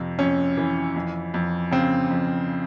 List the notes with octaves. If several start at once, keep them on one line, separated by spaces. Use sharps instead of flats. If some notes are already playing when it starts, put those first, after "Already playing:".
Already playing: F2 C3
F2 C#4
E3
F2
F2
C#3 C4
F2